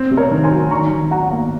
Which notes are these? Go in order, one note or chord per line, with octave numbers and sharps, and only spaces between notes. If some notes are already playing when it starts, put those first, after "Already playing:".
Already playing: C4
C3
A#4 C#5
D#3
G#5 C6
F#3
D#3 A#5 C#6
D#3
F#3 F#5 A#5
A#3